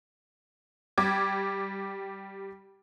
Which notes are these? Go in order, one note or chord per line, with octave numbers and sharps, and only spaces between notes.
G3 G4 D6 G#6